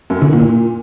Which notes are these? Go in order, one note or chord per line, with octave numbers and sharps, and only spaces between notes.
F#2
D3
A#2
A#2